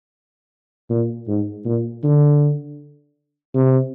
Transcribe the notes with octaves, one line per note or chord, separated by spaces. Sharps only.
A#2
G#2
A#2
D3
C3